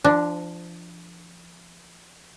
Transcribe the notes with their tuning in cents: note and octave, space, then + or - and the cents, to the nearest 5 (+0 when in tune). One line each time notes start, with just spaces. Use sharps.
F3 -25 D4 +5